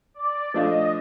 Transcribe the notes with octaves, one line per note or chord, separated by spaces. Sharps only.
D5
F3 A3 D4 F4 D#5